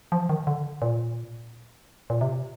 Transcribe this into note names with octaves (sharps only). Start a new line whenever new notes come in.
F3
D#3
D3
A#2
A#2
C3